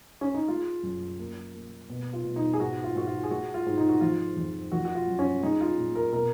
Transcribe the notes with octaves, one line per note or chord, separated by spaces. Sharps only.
C#4
D#4
G#3 F4
F#2
A#3
A#3
B2
F4
B2
D#4
G#4
G#2 F#4
F4
G#2 F#4
F4
G#4
G#3 F#4
F4
G#2
D#4
F#4
F3 F4
F2
F3 F#4
F#4
F4
F#2
C#4
G#3 D#4
F4
A#2
A#4
B2 A#4